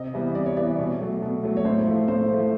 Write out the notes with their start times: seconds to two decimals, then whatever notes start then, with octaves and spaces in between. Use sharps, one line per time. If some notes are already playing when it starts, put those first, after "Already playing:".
Already playing: C3 D#5
0.14 E3 G3 B3
0.35 C3 D5
0.46 C#5
0.57 E3 G3 B3 D5
0.68 D5
0.79 B2
1.00 F#3 A3
1.22 B2
1.43 F#3 A3
1.57 C#5
1.65 A2 C5
1.87 F3 A3
2.08 A2 C5
2.30 F3 A3